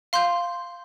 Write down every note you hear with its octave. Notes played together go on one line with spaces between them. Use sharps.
F5 C6 G6